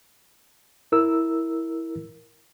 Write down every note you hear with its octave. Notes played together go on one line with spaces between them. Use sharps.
E4 A#4 E6